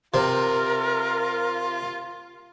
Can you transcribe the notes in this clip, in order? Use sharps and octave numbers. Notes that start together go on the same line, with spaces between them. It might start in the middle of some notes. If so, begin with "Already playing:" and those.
C3 F4 A#4 C5